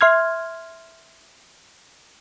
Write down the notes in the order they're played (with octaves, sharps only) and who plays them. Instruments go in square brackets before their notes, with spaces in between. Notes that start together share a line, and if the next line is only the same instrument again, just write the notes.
[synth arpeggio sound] E5 C6 F6 G#6